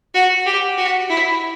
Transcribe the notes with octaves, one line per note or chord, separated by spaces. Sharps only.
F#4
G4
F#4
E4